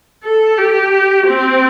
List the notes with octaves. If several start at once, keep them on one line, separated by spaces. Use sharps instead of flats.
A4
G4
C4